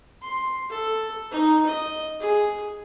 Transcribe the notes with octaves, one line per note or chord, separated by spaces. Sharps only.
C6
A4
D#4
D#5
G#4